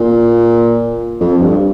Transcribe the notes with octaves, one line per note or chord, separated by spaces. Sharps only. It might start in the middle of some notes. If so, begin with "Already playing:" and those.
Already playing: A#2
F2
G2